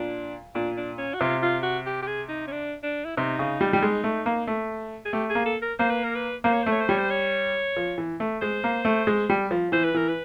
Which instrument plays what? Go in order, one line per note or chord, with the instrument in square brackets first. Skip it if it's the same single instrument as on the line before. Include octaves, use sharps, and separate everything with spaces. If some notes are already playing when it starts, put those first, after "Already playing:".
Already playing: [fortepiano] A#2 [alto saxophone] D4
[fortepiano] A#2 [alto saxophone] D4
[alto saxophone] D4
C#4
F#4
[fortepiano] C3 [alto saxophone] F4
[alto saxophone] F4
F#4
G4
G4
G#4
D#4
C#4
D4
D4
E4
[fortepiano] C3 [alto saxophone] D#4
[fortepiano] C#3
G3
G3
G#3
A3
A#3
A3
[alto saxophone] G#4
[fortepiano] A3 [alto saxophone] G4
[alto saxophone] G#4
[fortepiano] A#3
[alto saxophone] A4
A#4
[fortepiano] A#3 [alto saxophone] C5
[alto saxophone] B4
A#4
B4
[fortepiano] A#3 [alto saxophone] C5
[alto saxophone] C#5
[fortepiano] A3 [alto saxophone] C5
[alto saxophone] C#5
C5
[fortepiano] G3 [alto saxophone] C#5
[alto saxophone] C5
C#5
[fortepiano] F3
E3
A3
[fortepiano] G#3 [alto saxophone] C5
[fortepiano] A#3
A3
G#3
G3
F3
[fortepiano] E3 [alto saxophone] C5
[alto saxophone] B4
[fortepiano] E3 [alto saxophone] A#4
[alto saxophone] B4